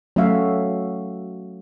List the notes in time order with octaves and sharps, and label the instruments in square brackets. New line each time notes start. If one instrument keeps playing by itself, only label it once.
[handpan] F#3 A3 C#4 F#4 E5 F5